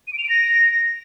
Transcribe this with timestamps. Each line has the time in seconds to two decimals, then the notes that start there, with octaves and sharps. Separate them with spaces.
0.07 D#7
0.13 D7
0.18 F7
0.24 D7
0.29 A#6